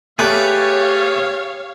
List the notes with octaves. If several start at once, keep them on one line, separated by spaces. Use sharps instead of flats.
A3 G4 G#4 B4 C#5 D5 F5